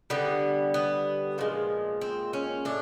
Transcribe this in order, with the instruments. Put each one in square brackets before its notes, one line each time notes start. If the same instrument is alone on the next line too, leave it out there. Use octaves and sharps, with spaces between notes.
[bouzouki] D3 G3 B3
B3
A#2 F3 G#3
C4
C#4
A2 D4